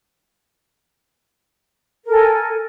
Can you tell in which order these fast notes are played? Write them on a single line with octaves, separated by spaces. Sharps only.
A#4 A4 G#5